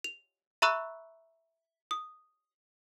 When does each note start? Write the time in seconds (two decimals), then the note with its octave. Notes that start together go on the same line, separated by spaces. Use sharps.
0.04 F7
0.62 E5 A#5 B5 C#6 E6 F#6
1.91 D#6